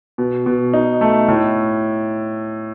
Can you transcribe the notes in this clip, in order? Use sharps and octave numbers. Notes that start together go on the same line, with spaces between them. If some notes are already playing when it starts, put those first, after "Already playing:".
B2
B2
D#4
A3
A2